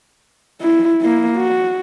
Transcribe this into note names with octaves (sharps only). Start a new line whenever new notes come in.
E4
A#3 E4
F#4